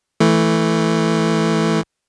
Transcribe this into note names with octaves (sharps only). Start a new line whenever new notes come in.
E3 A3